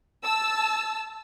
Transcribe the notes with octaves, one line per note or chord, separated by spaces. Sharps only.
A5 E6